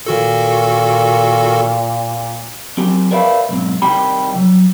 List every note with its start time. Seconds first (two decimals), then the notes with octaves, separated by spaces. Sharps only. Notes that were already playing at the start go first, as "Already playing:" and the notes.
0.06 A#2 D#3 F#4 A4
2.77 F#3 C4 G4
3.11 A#4 B4 D5 E5 F5 B5
3.49 B1 G#2 C4
3.82 C3 D#3 G3 G4 G5 B5
4.36 F#3